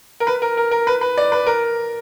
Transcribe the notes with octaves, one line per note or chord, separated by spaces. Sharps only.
A#4
B4
A#4
A#4
A#4
B4
B4
D5
B4
A#4